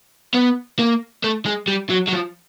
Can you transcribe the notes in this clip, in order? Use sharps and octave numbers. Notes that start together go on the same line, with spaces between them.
B3
A#3
A3
G#3
G3
F#3
F#3
F3